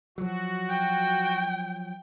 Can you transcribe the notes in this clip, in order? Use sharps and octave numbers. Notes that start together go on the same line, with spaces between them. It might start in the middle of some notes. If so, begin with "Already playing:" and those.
F3 F#3 F#4
G5